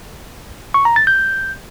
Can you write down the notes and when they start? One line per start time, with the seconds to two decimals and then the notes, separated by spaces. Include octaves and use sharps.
0.74 C#6
0.85 A#5
0.96 A6
1.07 G6